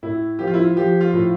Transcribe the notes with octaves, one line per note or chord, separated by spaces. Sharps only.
A2 E4
F3 G4
F4
E4
F4
F3 G4
F4
A2